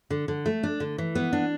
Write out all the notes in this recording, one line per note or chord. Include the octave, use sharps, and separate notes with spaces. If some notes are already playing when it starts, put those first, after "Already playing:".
D3
D3
A3
D4
D3
E3
B3
D4